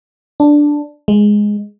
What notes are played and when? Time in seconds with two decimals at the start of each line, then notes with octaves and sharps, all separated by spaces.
0.40 D4
1.08 G#3